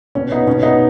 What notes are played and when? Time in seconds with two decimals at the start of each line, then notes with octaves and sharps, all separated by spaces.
0.15 B2 C#4
0.32 B3 D#4
0.47 B2 C#4
0.63 B3 D#4